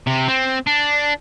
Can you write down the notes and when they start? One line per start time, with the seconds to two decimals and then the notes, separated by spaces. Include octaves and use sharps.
0.07 C3
0.28 C4
0.67 D4